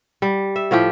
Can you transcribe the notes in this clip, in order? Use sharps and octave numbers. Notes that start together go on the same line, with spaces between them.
G3
E5
A2 F3 F4 G4